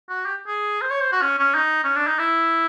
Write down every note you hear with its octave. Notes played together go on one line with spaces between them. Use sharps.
F#4
G4
G#4
C5
C#5
C5
F#4
C#4
C#4
D#4
C#4
D4
D#4
E4